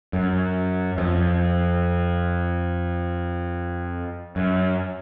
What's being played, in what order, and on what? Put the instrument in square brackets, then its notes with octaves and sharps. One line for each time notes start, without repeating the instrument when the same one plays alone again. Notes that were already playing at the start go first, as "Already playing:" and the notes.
[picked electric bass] F#2
F2
F#2